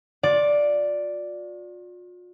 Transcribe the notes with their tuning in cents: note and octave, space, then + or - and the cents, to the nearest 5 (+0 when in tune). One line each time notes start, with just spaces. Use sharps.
F4 +45 D5 +0